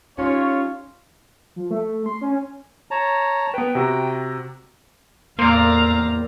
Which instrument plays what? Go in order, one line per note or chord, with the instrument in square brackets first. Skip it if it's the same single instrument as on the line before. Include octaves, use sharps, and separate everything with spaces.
[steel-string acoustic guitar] G3 C#4 D#4 [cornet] F4 [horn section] C#5
[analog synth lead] F3
A3
C6
C#4
[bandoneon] C#5 A5 A#5
[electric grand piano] B3 B4 [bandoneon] G5
[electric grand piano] C3 F#4 A#5
[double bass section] E2 A2 [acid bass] A#3 [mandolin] C4 D5 [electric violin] F5 A#5